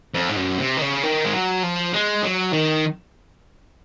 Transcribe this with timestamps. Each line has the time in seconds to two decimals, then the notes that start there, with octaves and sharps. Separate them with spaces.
0.14 F2
0.29 G#2
0.37 F#2
0.58 C3
0.77 D#3
0.82 C#3
1.04 D#3
1.25 G#3
1.33 F#3
1.63 F3
1.93 G#3
2.22 F#3
2.53 D#3